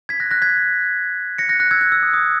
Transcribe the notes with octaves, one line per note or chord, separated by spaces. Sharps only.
G#6 B6
F#6 A#6
F#6 A#6
G#6 B6
A#6 C#7
F#6 A#6
F#6 A#6
E6 G#6
F#6
E6
D#6
D#6